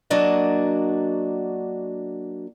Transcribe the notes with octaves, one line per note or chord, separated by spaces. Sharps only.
F#3 A#3 D4 F#4 D#5